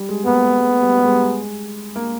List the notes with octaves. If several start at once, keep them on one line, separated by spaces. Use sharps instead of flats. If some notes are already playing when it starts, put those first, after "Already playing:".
Already playing: G3
G#3
A#3 B3
A3
G#3
G3
G3
G#3
A#3